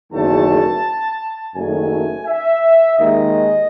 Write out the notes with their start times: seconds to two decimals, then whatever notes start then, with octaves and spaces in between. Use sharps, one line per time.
0.11 F#1 E2 D#3 F#3 A3 A5
1.55 F#1 F#2 D#3 A3 G#5
2.27 E5
2.97 D#2 D#3 G#3 D#5